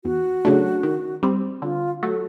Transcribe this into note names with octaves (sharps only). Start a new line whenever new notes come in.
E2 F#4
C#3 F#3 A3 D4
D#3
G3 C4
D3 F4
F#3 A3 F#4